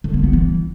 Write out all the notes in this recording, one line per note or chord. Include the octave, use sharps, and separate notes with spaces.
D3
A#3
B3
E3